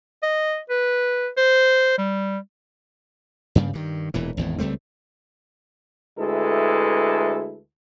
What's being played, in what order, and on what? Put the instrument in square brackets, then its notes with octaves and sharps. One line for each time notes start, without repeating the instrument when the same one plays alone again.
[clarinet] D#5
B4
C5
G3
[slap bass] G2 C#3 G3 A#3
G2 D#3
E1 A#2 E3
G#1 E2 A2
C#2 G3 A3 C4
[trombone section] D2 G#3 E4 A4 B4